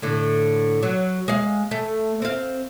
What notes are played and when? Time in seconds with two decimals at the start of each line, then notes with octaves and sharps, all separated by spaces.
0.02 A2 D3
0.83 F#3
1.28 G#3 F5
1.71 A3
2.22 C4 F5